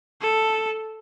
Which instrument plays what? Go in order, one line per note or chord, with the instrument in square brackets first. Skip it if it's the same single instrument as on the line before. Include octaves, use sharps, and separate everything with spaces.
[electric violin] A4